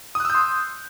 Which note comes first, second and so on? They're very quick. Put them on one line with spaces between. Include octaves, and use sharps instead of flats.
D#6 F#6 E6 G6 C6